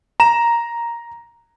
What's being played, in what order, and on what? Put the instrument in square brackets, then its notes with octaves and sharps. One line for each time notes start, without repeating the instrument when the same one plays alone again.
[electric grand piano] A#5 E7